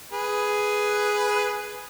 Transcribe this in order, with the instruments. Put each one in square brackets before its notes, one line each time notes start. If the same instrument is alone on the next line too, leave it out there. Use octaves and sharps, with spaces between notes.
[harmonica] G#4 B4